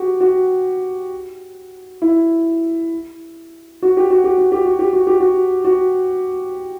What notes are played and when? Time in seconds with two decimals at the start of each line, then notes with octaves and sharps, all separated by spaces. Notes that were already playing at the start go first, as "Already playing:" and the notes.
Already playing: F#4 G4
0.20 F#4
2.02 E4
3.82 F#4
3.97 G4
4.10 F#4
4.24 G4
4.38 F#4
4.52 G4
4.65 F#4
4.79 G4
4.93 F#4
5.07 G4
5.20 F#4
5.64 F#4